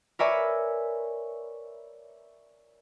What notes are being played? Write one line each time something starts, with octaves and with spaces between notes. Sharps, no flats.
A#4 B4 C#5 D5 E5 G#5